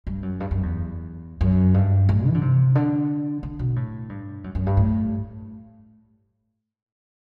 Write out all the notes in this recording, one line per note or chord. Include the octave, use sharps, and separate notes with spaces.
G2
F#2
G2
F#2
E2
F#2
G2
A2
E3
D3
C3
D3
D3
B2
A2
G2
F#2
F#2
G2
A2